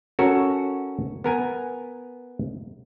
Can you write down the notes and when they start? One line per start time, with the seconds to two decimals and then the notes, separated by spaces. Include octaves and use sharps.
0.19 C#4 F#4 A4 A#4
1.24 B3 A#4 G#5